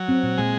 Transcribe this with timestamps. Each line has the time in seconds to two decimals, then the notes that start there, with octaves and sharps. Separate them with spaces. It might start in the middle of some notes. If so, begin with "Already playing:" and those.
Already playing: F#3
0.09 C4
0.23 A#2
0.38 A#2 G#3